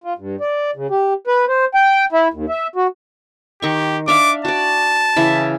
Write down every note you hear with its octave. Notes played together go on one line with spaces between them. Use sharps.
F4
G2
D5
C#3
G4
B4
C5
G5
E4
D#2
E5
F#4
D#3 G4 C#6
D4 E5 F5 D6
F#4 D5 A5
C#3 E3 E5